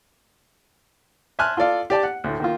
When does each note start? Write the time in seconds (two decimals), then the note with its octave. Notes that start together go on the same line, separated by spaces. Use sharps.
1.39 E5 G#5 A5 C6 F6 F#6
1.57 F4 A4 D5 F5
1.90 G4 D5 A5
2.03 F#5
2.24 D2 A2
2.40 D#3 A#3 F4